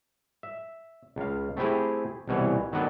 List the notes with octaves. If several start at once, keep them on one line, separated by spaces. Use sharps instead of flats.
E5
C#2 F5
A3 C4 E4 G4 G#4
C2 B2 E3 C#5
D#3 F#3 B3 D4 A4